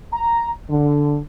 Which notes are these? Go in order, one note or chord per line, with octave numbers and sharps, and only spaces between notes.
A#5
D3